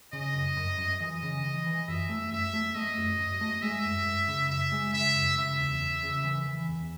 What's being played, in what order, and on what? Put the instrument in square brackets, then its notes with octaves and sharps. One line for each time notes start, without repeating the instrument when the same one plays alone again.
[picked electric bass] C#3 [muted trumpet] D#5
[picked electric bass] F#2
F#2
F#2
[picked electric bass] E3 [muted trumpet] D#5
[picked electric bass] C#3
E3
E3
[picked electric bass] F#2 [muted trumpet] E5
[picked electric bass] A3
[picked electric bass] F#2 [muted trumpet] E5
[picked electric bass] A3
[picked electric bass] A3 [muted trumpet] D#5
[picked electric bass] F#2
F#2
A3
[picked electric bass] G#3 [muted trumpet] E5
[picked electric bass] F#2
F#2
C#3
[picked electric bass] F#2 [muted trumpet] E5
[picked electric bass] G#3
[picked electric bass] C#3 [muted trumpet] E5
[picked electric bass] F#2
[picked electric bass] C#3 [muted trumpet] E5
[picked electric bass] E2
E2
C#3
E3
E3
E2